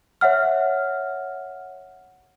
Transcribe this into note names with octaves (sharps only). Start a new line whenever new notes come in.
C#5 E5 F#5 F6